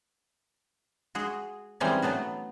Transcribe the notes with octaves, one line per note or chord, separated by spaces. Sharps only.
G#3 F#4 G#4
E3 G3 G#3 C4 C#4 D#4
F#3 A3 B3 F#4